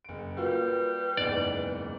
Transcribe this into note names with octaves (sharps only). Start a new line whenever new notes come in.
F#1 D7
G3 A#3 F4 F#4 B4
F#1 E2 G#2 D5